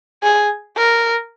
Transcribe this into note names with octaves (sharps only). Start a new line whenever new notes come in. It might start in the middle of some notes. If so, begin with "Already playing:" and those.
G#4
A#4